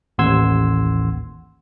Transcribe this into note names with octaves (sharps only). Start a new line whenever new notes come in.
A1 D#2 F#5 C6 E6 G#6